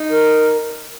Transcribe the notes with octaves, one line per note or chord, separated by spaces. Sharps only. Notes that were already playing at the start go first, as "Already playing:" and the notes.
Already playing: D#4
A#4